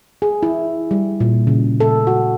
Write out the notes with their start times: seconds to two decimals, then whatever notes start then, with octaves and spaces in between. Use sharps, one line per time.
0.22 G#4
0.43 E4
0.91 G3
1.20 A#2
1.47 C#3
1.80 A4
2.07 F#4